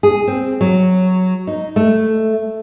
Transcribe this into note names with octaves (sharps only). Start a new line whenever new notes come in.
G#4
C4
F#3
D#4
A3